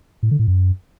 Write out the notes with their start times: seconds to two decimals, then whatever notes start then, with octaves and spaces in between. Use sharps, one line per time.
0.23 A2
0.31 D3
0.39 A2
0.48 F#2